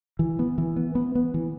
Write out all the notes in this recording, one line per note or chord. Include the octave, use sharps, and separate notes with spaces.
E3
B3
E3
B3
B3
B3
E3